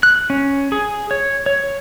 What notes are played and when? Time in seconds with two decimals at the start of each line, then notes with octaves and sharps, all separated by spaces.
0.03 F#6
0.30 C#4
0.72 G#4
1.11 C#5
1.46 C#5